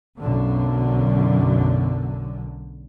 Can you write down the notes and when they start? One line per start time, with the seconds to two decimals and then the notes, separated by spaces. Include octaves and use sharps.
0.18 B1 F#2 D3